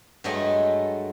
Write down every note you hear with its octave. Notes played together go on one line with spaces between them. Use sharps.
G2 F#3 G#3 A3 D#5